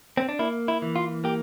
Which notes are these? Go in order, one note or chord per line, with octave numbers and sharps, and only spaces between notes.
C4
D4
A#3 E4
E4
E3
F4
A#3 G4